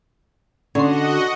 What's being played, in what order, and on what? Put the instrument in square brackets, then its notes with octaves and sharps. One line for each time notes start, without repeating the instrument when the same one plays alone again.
[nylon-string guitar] D3 [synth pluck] C#4 C6 [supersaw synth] F#4 D#5 F#5